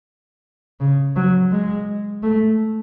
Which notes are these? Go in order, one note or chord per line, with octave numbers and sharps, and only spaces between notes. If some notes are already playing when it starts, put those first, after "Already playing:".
C#3
F#3
G#3
A3